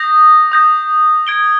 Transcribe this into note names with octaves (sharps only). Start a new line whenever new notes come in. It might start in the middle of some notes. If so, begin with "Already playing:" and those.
Already playing: D#6 G6 A#6
D#6 G6 A#6
G#6 D7 G7